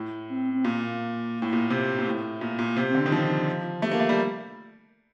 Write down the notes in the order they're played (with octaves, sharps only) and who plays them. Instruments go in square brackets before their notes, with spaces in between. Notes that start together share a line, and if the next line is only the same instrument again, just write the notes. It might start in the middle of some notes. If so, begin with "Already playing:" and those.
Already playing: [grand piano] A2
[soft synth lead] C4
C4
[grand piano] A#2 [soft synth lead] A#3
[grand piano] A2
A#2
C3
A#2
[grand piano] A2 [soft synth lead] A3
[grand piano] A#2
A#2
C3
[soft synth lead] C4
[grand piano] D3 [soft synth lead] D4
[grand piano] D#3
[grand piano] F3 [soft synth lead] F4
[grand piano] A3 [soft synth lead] G4
[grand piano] A#3
A3
G3